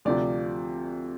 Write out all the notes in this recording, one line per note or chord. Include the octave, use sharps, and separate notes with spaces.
D2 C3 F3 D5